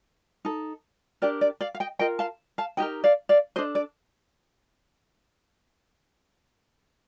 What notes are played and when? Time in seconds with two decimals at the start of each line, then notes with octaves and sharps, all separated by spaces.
0.45 D#4 A4
1.22 D4 G4 A#4 D5
1.41 D5
1.61 D5 F5
1.75 F5
1.80 D#5 G5
1.99 F4 A#4 D#5 G5
2.19 F5 A5
2.58 F5 A5
2.77 D#4 G4 A#4 D#5 G5
3.04 D5 F5
3.29 D5 F5
3.56 D4 A4 C5 D#5
3.75 D5